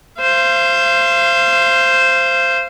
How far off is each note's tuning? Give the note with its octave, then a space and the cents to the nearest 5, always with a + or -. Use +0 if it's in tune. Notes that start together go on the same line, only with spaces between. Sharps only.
C5 +0 F5 -35